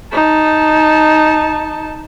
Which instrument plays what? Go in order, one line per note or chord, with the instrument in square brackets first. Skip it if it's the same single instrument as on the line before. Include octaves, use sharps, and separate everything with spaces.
[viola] D#4 A5